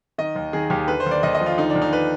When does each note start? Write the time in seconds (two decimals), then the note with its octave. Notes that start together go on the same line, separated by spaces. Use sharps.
0.18 D#3 D#5
0.36 D#2
0.53 D#3 G#4
0.70 D#2 G4
0.88 D3 B4
1.00 C5
1.06 D#2
1.11 D5
1.23 D#2 D#5
1.35 D#5
1.40 F3
1.46 F4
1.58 D3 D#4
1.70 D4
1.75 D#2
1.82 D#4
1.93 B4